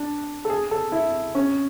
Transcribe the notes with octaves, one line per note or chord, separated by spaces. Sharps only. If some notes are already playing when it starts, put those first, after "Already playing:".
Already playing: D4
A4
G#4
A4
E4
C#4